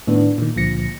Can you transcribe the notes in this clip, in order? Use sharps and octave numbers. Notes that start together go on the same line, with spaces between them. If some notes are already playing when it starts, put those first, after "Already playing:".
A2 D#3 B3 D4
A#2 D#3
C#2 A#2 D3 F3 A#6 C#7